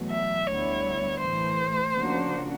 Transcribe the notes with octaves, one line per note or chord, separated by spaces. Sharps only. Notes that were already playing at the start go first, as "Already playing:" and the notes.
Already playing: E2 B2 F#3 A3
E5
D2 D3 G3 B3 E4 C#5
A2 E3 A3 C5
C#3 F3 A#3 D4 F#4